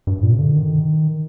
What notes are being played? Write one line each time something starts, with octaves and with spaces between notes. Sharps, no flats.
G2
A#2
C3
D3
D#3